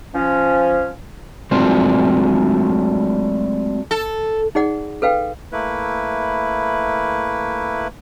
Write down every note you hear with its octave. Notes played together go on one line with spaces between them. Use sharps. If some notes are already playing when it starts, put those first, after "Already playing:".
F3 C#4
F#3 G#3 A3 C4 D4 F4
A4
D#4 G#4 D5 F#5
A4 B4 F5 G5
A3 A#3 E4 B4